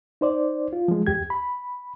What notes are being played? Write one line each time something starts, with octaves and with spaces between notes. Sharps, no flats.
D#4 C5 D5
F4
F3 G#3
E2 G4 G#6
B5